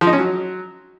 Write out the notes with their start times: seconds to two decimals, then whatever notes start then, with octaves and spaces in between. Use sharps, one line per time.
0.01 F3
0.07 D#4
0.13 C#4
0.19 F#3